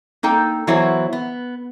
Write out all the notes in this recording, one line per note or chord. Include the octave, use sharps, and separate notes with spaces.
A#3 D#4 A4 G5
E3 F#3 B3 E4 C5 C#5
B3